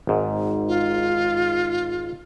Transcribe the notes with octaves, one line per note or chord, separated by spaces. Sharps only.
G#1 G#2
F4